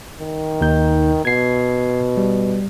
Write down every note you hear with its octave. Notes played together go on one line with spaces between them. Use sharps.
D#3
D#2 D#4 G6
B2 G#6 C7
G3